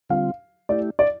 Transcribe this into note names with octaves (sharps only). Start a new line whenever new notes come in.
D3 G3 C4 F4 F5
A3 E4 G4 D5
D5